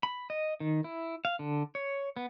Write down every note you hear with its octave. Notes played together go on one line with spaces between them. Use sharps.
B5
D#5
D#3
E4
F5
D3
C#5
B3